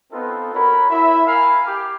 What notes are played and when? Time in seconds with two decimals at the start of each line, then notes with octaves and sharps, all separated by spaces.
0.12 B3 C4 D#4 F4 A4 B4
0.54 F#4 A#4 C#5 B5
0.89 E4 E5 B5
1.27 A#4 F5 G#5 B5
1.66 G4